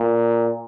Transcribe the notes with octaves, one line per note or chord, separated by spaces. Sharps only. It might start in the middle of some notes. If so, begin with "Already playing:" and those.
Already playing: A#2